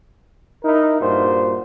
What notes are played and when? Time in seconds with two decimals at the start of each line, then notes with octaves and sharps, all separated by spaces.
0.65 D#4 E4 A#4
1.01 G2 A#2 F#4 C5